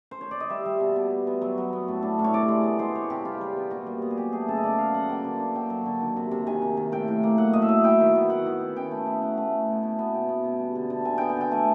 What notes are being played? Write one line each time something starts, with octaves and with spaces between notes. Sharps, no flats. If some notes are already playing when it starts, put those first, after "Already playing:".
C5
C#5
D5
D#5
G3 E5
G3
B2
B2
B3
B3
F#3
F#3
B3
A2
D4
A2
C#5
C3 D5
G#3
B3
G#3 C5
B3 C#5
C3 G4
G3 F4
G3
B3
A#2 F#4
G3
B3
G#4
F#3 G4
A3 G#4
C#3 A4
D#5
C#3 D5
F#3 F5
F#3 F#5
A#3 G5
D3
D3
F#3 G5
F#3
D3
D#3
C3
C3
D#3 G#5
C3
D#3
A2 G5
A2
A#3
F#3 F#5
A2 D#5
E5
F#3
E4 G5
D#3
B3
E4 F#5
D#3
D#3
C#4 G5
A3
E4
E4 F#5
A3
A3
B2
B2
B3
B2 G5
B3
B2
G3
D3
D3
D3 G#5
B3 G5
G#5
D3 G5
A3 G#5